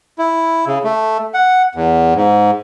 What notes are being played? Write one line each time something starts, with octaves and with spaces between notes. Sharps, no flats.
E4
C#3
A3
F#5
E2
G#2